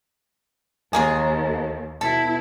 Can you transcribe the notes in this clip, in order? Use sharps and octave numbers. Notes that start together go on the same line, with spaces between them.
D#2 G#3 A#3 G#4
B2 E4 A4